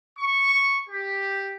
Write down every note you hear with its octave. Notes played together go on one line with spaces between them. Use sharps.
C#6
G4